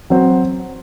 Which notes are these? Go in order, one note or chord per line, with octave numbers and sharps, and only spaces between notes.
F#3 C4 F#4 C5